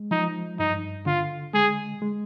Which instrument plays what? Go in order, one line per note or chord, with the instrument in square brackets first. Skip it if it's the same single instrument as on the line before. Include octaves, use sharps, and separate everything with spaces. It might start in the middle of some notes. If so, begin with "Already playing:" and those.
Already playing: [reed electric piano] G#3
[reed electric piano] F3 [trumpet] D#4
[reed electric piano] G2 [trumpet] D#4
[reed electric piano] D3 [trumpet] F4
[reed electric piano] G#3 [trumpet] G#4
[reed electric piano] G#3